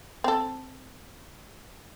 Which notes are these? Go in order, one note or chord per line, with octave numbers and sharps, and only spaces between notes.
C4 A4